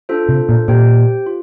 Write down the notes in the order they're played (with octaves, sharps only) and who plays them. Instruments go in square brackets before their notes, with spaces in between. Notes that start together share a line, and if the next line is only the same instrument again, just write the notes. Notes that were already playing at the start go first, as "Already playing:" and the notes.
[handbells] D4 F4 A4 C5
[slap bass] C3
A#2
[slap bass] A#2 [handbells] G4 C5 G5
[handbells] F4